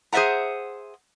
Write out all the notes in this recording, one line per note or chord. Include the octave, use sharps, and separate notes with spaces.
G#4 C5 D5 E5 F#5 A#5